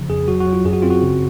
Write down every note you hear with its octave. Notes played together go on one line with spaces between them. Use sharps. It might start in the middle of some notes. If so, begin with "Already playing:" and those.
Already playing: C#3 F3
F2 G#4
F#3 F#4
F#4
F#3
F4
F#2 G#4
F#4
C4 F4
F#4
C#3